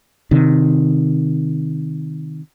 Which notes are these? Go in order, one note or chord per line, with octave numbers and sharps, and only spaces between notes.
C3 D#3